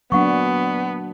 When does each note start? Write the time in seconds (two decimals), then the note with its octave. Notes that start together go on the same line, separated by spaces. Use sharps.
0.12 F#3 A#3 B3 D4 F#5 C#6